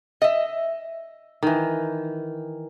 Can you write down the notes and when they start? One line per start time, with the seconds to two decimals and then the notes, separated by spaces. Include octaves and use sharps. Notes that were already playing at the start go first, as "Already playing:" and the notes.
0.22 D#5 E5
1.43 D#3 E3